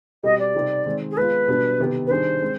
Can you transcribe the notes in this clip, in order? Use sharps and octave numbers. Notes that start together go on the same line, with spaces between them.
B2 G3 C4 G4 D#5
D5
C3 G3 C4 D#4 G4
D#3 G#3 C4
G#4
G#3 B3 F4 B4
B2 G3 B3 D4
C3 D#3 B3 D#4 G4
B4
D#3 G3 D4 G#4 C5
G#3 C4